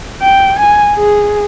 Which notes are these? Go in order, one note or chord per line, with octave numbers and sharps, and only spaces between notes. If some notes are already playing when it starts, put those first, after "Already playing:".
G5
G#5
G#4